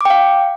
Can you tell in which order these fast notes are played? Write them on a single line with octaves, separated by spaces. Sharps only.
D6 G5 F5